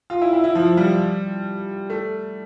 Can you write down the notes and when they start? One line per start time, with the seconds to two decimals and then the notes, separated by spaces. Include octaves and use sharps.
0.10 F4
0.22 E4
0.33 E4
0.44 E4
0.55 F3
0.77 G3
1.90 A3